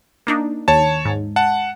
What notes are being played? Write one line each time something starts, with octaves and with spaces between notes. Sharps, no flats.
A#3 D4 D#4
D#2 C#5 A5
G#2
F#5 A5